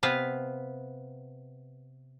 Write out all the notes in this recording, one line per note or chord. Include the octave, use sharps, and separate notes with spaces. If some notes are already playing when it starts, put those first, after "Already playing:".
C3 B3 B4 F5